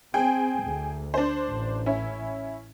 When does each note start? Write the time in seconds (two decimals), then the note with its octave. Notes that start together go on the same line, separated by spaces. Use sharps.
0.14 C4 G#4 G5
0.63 D2
1.14 D4 C5
1.49 A1
1.86 C#4 E4